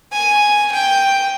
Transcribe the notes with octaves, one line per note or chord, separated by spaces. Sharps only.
G#5
G5